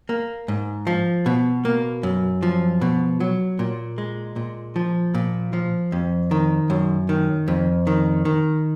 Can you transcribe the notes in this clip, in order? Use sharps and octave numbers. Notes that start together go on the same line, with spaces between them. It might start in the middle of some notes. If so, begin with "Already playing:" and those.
A#3
G#2
F3
B2
A#3
F#2
F3
B2
F#3
A#2
G#3
A#2
F3
A#2
F3
F2
D#3
F#2
D#3
F2
D#3
D#3